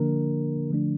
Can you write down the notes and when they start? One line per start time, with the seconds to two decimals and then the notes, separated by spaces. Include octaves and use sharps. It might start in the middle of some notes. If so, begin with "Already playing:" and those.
Already playing: D3 F3 A#3 D4 A#4
0.70 D3 F3 A3 D4